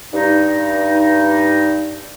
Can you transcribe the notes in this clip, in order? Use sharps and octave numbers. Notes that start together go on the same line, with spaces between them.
G2 D#4